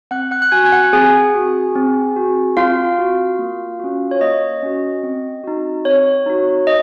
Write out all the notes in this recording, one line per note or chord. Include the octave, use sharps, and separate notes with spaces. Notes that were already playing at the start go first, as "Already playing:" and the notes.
C4 F#5 F#6
F#5 F#6
F#6
F#4 G#5 G#6
G#6
F#5 F#6
C4 G#4 G#5
F#4
C4
F#4
C4 F4 F5
F#4
A#3
C#4 F#4
C#5
A#3 D#5
C#4 F#4
C4
D#4 F#4
C4 C#5
D#4 F#4
D#5